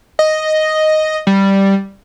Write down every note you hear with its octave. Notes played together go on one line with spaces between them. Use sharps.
D#5
G3